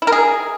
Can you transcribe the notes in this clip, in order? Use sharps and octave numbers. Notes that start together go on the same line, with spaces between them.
E4
A#4
G#4